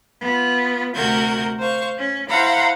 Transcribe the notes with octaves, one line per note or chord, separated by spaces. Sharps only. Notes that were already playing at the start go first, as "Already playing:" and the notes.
B3 F4
D2 C3 F#4 A#4 G6 G#6
C5 F5 C#6
C#4
E4 C5 F5 F#5 A#5 B5